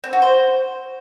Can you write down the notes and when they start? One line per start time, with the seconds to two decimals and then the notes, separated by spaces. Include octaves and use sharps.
0.04 C4
0.13 F#4
0.22 C5